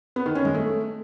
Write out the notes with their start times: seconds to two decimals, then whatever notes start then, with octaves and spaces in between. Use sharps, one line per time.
0.16 B3
0.26 D#3
0.35 C#4
0.45 G#3
0.54 A3